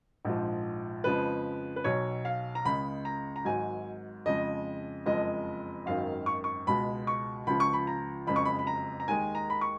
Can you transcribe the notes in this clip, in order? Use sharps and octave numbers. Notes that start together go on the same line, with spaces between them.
A#1 G#2 F3
F2 C#3 F3 G#3 B4
B4
B1 B2 F#3 C#5
F5
A#5
C#2 C#3 G#3 B5
A#5
A#5
G#1 G#2 F#3 G#5
F2 C#3 F3 G#3 D#5
F#1 F2 F3 G#3 D#5
G#1 F#2 D#3 F5
C#6
C#6
C#2 B2 G#3 B5
C#6
C#2 C#3 F3 B5
C#6
B5
A#5
F#1 F2 C#3 G#3 B5
C#6
B5
B5
A#5
A#5
D#2 D#3 G#3 G#5
A#5
B5
C#6